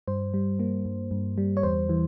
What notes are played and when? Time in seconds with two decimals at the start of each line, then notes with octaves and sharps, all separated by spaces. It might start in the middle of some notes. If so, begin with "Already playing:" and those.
0.08 G2 C5
0.34 G3
0.59 A#3
0.85 G2
1.11 G2
1.38 G3
1.57 C#5
1.63 E2 C5
1.89 E3